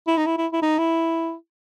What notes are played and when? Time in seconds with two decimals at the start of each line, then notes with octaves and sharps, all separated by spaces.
0.07 E4
0.17 D#4
0.26 E4
0.38 E4
0.53 E4
0.62 D#4
0.78 E4